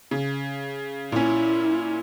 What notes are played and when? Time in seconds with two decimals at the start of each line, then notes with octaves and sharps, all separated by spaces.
0.11 C#3
1.12 A#2 C#4 E4